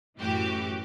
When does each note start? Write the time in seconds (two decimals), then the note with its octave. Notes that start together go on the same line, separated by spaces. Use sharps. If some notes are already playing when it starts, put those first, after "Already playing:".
0.19 F#2 A2 E3 F#4 G4 D6